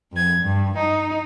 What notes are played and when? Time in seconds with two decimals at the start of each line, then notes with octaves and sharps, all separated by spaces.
0.12 F2 G#6
0.42 G2
0.78 D#4